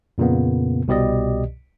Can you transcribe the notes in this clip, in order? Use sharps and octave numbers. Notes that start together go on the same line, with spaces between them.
F2 A#2 C#3 A#3 B3
C2 B2 G4 D5 D#5